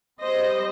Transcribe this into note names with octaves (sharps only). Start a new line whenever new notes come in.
G3 C4 C5 D#5